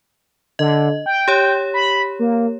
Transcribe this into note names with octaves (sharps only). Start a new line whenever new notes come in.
D3 D#5
G5
G4 C#5
B5
A#3